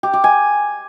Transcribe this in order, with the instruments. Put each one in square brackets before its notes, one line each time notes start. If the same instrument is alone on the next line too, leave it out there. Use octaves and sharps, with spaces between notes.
[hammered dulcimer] G4
G4
G#5